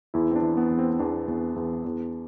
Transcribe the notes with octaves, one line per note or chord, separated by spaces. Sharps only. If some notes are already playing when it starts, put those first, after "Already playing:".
E2 E4
C4
D4
E3
B3
E2
C4
C4
E2 D4
E2
E2
E2